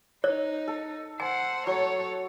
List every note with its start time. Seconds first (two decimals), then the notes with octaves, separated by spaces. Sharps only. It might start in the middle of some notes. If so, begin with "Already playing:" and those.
0.24 D#4 C#5
0.68 A4
1.20 C5 F#5 G#5
1.67 F#3 A4 C#5